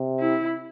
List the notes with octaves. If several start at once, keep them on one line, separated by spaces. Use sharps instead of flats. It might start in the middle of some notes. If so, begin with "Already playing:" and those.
Already playing: C3
E4